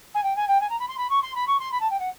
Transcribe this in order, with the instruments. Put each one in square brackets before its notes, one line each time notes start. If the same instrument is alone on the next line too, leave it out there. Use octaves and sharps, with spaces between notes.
[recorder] G#5
G5
G#5
G5
G#5
A#5
B5
C6
B5
C#6
C6
B5
C#6
C6
B5
A5
G5
F#5